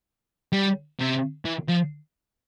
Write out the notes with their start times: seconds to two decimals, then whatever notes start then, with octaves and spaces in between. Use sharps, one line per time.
0.52 G3
0.99 C3
1.45 E3
1.69 F3